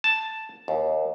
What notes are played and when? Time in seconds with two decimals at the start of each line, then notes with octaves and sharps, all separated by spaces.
0.04 A5
0.68 D#2